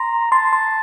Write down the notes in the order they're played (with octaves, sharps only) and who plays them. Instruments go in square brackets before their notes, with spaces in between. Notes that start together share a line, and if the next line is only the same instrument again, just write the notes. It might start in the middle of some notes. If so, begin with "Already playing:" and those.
Already playing: [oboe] A#5 [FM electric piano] C6
[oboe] A5 [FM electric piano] C6
[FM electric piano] C6